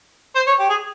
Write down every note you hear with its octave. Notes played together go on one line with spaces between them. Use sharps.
C5
C#5
G4
G#4